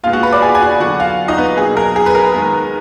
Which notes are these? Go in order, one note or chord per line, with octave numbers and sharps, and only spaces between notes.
A#2 G#3 B3 F4 F5
F#4 F#5
B4 B5
D5 D6
G#4 G#5
G#5
F#4 F#5
D3 F#3 B3 F#4 F#5
F4 F5
D#4 D#5
B3 B4
B2 F#3 A#3 G#4
A#4
G#4
B4
A#4
D#3 G#3 B3